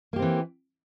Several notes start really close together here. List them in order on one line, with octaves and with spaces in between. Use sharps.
A#3 G4 C4 E3